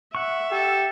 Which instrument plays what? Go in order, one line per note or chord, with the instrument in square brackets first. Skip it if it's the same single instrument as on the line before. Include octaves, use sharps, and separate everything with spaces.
[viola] E5 [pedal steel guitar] F#5 C#6
[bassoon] G4 [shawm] A4